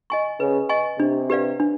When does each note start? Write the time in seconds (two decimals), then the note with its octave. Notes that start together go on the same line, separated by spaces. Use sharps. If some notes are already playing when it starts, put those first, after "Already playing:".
0.10 D#5 G#5 C#6
0.40 C#3 B4
0.69 D#5 G#5 C#6
0.99 C3 D4
1.30 G4 B4 D5 F5
1.60 D4